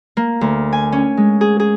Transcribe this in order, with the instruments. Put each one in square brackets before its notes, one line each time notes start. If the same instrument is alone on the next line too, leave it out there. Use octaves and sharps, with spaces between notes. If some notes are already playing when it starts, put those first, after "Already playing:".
[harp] A#3
D2
G#5
C#4
G#3
G#4
G#4